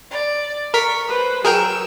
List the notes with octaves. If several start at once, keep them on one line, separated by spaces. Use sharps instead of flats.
D5
A#4 C#6 B6
B4 C5
F#3 G#4 A#4 G5 E6